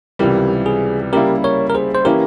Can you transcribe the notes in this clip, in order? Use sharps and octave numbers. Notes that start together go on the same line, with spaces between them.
C#2 C3 E3 G3 G4 A#4
G#4
C#3 G3 A#3 E4 G4 A#4
A#4 C#5
A#4
G#4 C5
C5
E3 A#3 C#4 E4 G4 A#4